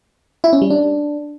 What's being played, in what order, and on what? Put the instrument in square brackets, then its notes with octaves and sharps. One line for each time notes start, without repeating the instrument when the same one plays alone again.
[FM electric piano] E4
C#4
G3
D4